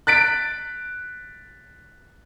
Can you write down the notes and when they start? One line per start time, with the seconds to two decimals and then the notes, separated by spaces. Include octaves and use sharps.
0.07 F#6 A6 B6 D7